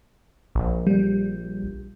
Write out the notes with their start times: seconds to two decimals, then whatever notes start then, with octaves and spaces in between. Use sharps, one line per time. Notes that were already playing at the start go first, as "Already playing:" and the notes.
0.55 A#1
0.87 G3